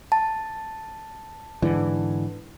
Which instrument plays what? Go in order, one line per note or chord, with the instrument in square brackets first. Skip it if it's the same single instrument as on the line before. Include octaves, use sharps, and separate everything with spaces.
[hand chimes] A5
[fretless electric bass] G#2 D3 E3